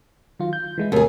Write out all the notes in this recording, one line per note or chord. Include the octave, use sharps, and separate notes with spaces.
D#3 F#3 F4
G6
E3 G#3 E4
D#2 C3 G#3 A3 G#4